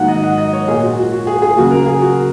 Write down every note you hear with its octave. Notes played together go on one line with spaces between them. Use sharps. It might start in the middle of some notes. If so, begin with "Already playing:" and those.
Already playing: G#2 D#3 F#3 A#3 F#5
D#5
F#5
D#5
C#5
A#2 G#3 G#4
F#4
F#4
F#4
G#4
G#4
C#3 F#3 A#3 F#4
A#4
G#4
F#4